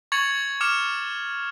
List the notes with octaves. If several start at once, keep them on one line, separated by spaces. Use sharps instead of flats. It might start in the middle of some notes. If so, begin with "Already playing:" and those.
C#6 G#6 A6 C#7 F7 F#7
D6 F6 C#7 E7 F7